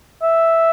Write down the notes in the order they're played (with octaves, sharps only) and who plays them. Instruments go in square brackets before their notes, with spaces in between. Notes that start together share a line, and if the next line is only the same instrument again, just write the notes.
[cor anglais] E5